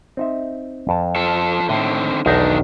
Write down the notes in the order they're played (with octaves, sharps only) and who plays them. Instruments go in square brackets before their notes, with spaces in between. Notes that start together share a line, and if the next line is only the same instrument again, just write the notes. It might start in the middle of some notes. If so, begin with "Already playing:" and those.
[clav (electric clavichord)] C4 D#4 E5
F2 A5
[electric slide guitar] F3 A4
[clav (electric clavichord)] A2 [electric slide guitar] D3 D#3 C4
[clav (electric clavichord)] B1 E2 D#4 [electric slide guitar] D#3 D4